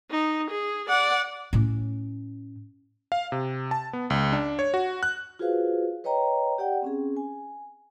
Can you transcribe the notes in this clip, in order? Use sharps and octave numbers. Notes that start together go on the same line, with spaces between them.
D#4
G#4
D5 F#5
A2 C#4
F5
C3
A5
B3
C#2
D4
C#5
F#4
F#6
F4 F#4 G#4 B4 C5 F5
B4 C#5 D#5 G5 A#5
G4 D5 F#5 G5
C4 C#4 G#4
G#5